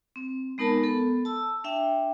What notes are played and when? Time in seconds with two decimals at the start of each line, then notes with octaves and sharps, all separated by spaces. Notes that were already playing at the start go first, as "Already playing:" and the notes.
0.16 C4
0.58 G#3 B3 D#4 A#4 A5 B5
0.83 B3 A4
1.25 A5 E6
1.64 D4 E5 G5